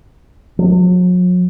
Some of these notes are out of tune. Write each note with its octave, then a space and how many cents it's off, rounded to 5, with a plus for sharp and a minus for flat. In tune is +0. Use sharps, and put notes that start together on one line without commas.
F#3 -40